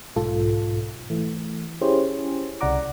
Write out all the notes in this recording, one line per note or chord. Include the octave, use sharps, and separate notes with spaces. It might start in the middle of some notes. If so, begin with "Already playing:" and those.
B1 G#2 F4 A4
E3 A3
C#4 E4 G4 G#4 C5 C#5
C2 C#3 D5 F#5 A#5 D6